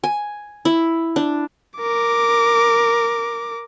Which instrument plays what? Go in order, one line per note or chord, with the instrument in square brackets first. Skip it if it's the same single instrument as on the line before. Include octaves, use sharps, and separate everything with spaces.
[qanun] G#5
E4
D4
[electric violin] A#4 D6